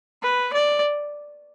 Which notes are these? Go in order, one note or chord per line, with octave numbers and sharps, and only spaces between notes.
B4
D5